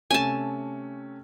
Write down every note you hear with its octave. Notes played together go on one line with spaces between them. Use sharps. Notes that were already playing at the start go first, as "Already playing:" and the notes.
C3 A3 C#4 G#5 A5